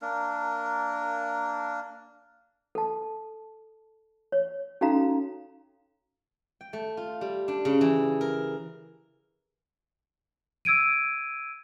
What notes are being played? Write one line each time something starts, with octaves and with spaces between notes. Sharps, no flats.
A#3 D4 A#4
A4 A5
C#5
C#4 D#4 F#4 A4 F5 A#5
G5
A3
F4
G3
D4
C#3
E3
A#4
E6 G#6 D7 D#7